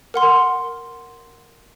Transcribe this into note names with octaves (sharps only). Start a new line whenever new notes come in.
A#4 F#5 C6